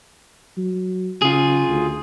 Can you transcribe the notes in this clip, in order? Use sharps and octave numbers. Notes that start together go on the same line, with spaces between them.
F#3
C#3 F4 G#4
D2